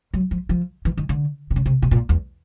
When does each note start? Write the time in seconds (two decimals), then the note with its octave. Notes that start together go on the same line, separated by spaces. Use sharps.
0.14 F#3
0.31 F3
0.49 F3
0.85 E3
0.98 D#3
1.09 D3
1.51 C3
1.56 C#3
1.66 C3
1.82 B2
1.91 A#2
2.09 E2